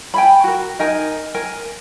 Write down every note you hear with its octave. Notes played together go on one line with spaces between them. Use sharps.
G5 G#5 B5
F#4 A#4
D#4 A#4 G#5
A#4 G#5